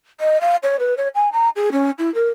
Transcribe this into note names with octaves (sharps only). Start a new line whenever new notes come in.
D#5
F5
C#5
B4
C#5
G#5
A#5
G#4
C#4
E4
A#4